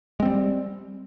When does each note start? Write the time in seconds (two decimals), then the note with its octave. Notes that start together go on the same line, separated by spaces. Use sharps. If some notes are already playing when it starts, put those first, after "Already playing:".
0.20 G#3
0.22 C4
0.25 G3